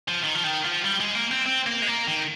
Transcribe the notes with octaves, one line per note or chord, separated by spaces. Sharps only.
F3
D#3
F3
D#3
F3
G3
G#3
A#3
C4
C4
A#3
G#3
A#3
D#3